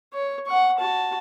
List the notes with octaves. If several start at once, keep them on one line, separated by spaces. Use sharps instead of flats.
C#5
F#5 C#6
F#4 A5